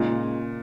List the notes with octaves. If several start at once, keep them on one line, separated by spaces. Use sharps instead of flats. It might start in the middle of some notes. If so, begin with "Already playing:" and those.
Already playing: A#2 C#3 G#3 D#4